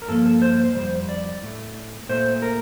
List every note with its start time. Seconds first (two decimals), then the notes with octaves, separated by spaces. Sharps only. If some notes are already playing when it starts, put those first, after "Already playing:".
0.02 A#4
0.08 G2 F3 A#3 A4
0.26 A4
0.42 C5
0.54 C5
0.64 C5
0.75 C3 G3 C5
0.79 F2
1.09 D5
1.43 A2 A3
2.09 A#2 A3 C5
2.42 A#4